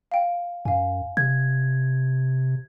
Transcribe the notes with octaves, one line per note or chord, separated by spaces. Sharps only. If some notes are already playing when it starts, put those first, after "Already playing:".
F5 G5
F#2 F5 G#5
C3 G#6